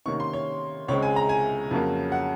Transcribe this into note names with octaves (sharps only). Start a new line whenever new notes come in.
C3 D#3 A#3 C#4 C#6
C6
C#5
C#2 C#3 G#3 C4 C#5
G#5
A#5
G#5
F2 C#3 F#3 A#3
F#5